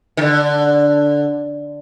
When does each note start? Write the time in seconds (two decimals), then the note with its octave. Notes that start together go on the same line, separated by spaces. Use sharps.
0.17 D#3
0.21 D3